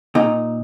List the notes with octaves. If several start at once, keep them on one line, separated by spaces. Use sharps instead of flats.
A#2 D#4